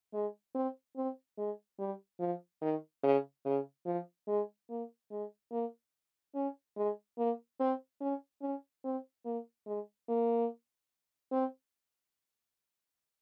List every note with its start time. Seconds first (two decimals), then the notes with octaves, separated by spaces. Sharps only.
0.13 G#3
0.55 C4
0.96 C4
1.38 G#3
1.79 G3
2.20 F3
2.61 D#3
3.03 C#3
3.45 C#3
3.86 F3
4.28 G#3
4.70 A#3
5.11 G#3
5.51 A#3
6.35 C#4
6.77 G#3
7.18 A#3
7.60 C4
8.01 C#4
8.42 C#4
8.84 C4
9.25 A#3
9.66 G#3
10.09 A#3
11.32 C4